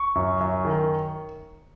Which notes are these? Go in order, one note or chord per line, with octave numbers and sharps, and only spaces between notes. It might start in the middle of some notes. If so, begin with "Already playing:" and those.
Already playing: C#6
F#2
F#2
D#3